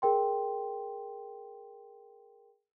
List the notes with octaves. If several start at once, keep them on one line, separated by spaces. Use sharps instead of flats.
G#4 A#4 G5 C6